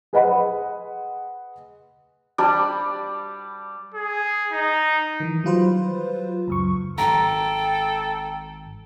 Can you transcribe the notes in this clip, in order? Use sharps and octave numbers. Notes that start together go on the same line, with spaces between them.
G#4 B4 C5 D#5 F#5 B5
G3 D4
G#4
D#4
D#3 E3
F#3 G3 F4 B4 C5
C#2 F#2 C#6
G#1 A4 G5 A#5